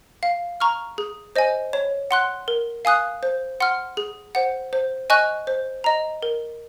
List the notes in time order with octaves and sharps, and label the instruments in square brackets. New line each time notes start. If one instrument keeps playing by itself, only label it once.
[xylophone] F5
A#5 C#6 F6
G#4
C5 D#5 G#5
C#5
F#5 C6 F#6
A#4
F5 G#5 D#6 F#6
C5
F#5 C6 F6
G#4
C5 F#5
C5
D#5 G#5 C#6 F#6
C5
D#5 A#5
A#4